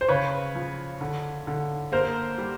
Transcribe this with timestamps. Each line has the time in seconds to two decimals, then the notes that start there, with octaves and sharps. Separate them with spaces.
0.01 C5
0.08 C#3 B4 C#5
0.55 F3
1.01 D3
1.47 D3
1.92 A#3 A#4 C5
2.38 G3